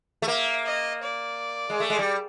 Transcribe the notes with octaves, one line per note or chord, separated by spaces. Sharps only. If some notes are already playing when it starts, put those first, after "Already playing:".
A3
A#3 E5
D#5
D5
G#3
A3
G#3
G3